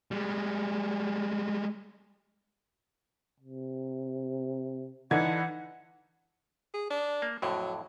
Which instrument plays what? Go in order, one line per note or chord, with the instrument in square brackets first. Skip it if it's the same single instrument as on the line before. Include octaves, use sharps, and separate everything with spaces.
[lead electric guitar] G3 G#3
[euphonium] C3
[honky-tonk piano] D3 G#6 [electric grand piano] E3 D#4 E4 [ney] F#5
[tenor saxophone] G#4
D4
[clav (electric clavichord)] A#3
[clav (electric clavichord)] F2 A2 D3 [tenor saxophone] F#3